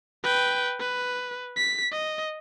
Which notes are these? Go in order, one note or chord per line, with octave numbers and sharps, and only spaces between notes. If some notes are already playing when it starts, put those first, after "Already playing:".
B4 G5
B4
B6
D#5